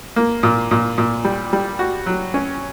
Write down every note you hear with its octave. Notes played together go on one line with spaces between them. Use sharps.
A#3
A#2
A#2
A#2
G3
G3
F#4
F#3
C#4